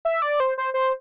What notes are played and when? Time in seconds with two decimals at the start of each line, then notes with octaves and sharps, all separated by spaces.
0.05 E5
0.22 D5
0.40 C5
0.58 C5
0.74 C5